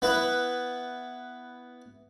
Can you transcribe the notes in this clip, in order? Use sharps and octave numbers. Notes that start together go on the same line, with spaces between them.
B3 E4 B4